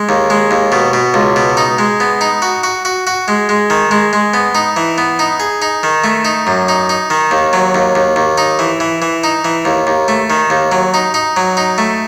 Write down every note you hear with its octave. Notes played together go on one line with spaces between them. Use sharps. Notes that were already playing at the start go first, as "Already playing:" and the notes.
Already playing: G#3
D#2
G#3
D#2
B2
B2
C#2
B2
D#4
G#3
B3
D#4
F#4
F#4
F#4
F#4
G#3
G#3
D#3
G#3
G#3
B3
D#4
E3
B3
D#4
G#4
D#4
D#3
A3
D#4
F#2
D#4
D#4
D#3
D#2
F#3
D#2
D#2
D#2
D#4
E3
E3
E3
D#4
E3
D#2
D#2
A3
D#3
D#2
F#3
D#4
D#4
F#3
D#4
A3